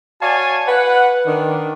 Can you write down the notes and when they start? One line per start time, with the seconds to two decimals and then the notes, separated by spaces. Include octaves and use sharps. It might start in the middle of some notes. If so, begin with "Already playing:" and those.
0.21 F#4 C#5 D5 F5 G#5 A5
0.67 B4 F#5
1.26 D#3 D4